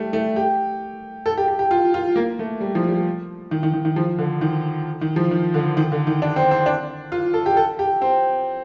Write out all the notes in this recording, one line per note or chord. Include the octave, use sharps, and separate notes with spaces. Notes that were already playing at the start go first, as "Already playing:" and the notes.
Already playing: G3 A3
A3
G4
A4
G4
G4
G4
F4
F4
A#3
A3
G3
F3
G3
D#3
D#3
D#3
D#3
F3
D3
D#3
D#3
F3
D#3
D3
D#3
D3
D#3
D4
C4
C4
D4
F4
A4
G4
A4
G4
C4